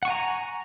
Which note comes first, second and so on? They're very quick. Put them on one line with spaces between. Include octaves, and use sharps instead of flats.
F#5 C#6 G#5 A#5